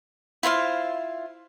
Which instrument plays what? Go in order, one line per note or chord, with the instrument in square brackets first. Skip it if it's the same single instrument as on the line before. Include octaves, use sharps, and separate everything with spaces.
[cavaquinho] E4 F4 C5 F5